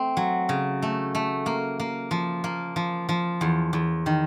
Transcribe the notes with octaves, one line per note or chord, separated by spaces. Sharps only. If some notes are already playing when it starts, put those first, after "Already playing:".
Already playing: A3 C4
F#3
C#3
A3
A3
A#3
A#3
F3
A#3
F3
F3
E2
E2
D#3